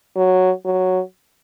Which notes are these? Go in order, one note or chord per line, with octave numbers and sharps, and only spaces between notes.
F#3
F#3